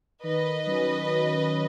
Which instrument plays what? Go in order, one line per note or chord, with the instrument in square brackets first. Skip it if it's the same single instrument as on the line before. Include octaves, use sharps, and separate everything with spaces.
[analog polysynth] D#3 [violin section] B4 D#5
[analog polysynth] F#3 C#4 F#4